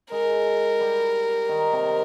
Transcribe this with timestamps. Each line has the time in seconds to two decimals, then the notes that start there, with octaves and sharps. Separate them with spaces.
0.11 G#3 A#4
0.80 G3
1.49 D#3
1.73 C3